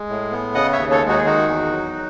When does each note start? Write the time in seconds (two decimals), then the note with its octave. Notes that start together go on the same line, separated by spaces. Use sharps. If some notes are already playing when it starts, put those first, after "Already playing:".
Already playing: G#3
0.09 A2
0.32 B3
0.55 C#3 D#5 F#5
0.73 C#5 E5
0.78 D#2
0.91 A4 C#5
1.02 G#3
1.09 D#4 F#4
1.18 G#4
1.25 D#3 D#4 F#4
1.49 E2
1.72 F#3